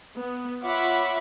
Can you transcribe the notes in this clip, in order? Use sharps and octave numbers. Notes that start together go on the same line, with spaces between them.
B3
F4 C#5 E5 F#5 B5 D6